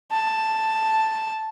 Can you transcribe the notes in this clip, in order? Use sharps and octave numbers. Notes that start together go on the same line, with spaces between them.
A5